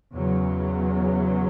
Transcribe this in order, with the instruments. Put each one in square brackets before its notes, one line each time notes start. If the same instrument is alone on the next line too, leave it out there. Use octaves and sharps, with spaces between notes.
[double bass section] E2 C#3 F#3